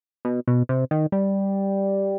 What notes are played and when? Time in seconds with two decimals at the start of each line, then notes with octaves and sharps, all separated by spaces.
0.25 B2
0.48 B2
0.69 C3
0.91 D#3
1.12 G3